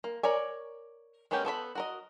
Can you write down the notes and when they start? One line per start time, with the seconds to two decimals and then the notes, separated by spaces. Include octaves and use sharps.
0.04 A#3
0.23 A#4 C#5 D5 G#5
1.31 G#3 A#3 B3 C#4 G4
1.45 B3 A4 C#5 B5
1.75 F#4 A#4 D#5